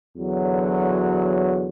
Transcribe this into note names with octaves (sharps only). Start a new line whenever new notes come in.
E2 D3 F#3